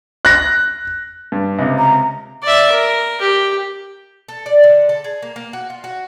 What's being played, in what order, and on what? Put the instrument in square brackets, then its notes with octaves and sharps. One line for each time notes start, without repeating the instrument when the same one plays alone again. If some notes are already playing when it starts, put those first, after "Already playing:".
[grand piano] F#6 A#6
[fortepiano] G2
C#2 C3
[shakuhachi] A#5
[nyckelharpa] D5 E5
A#4
G4
[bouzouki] A4
D5
D3
A4
G#4
A#3
A#3
F#4
F4
F#4